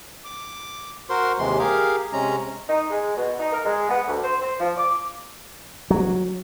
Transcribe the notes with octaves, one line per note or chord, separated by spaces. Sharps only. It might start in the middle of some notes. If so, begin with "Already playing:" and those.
D6
F#4 A#4 C5 C6
D#2 C3 E3 G#3 C6
G4 G#4 A#4 F5
C3 G#3 C#4 A#5
D#4
G#3
B2
D#4
A#4
G#3
B3
D2
C5
C5
F3
D6
F#3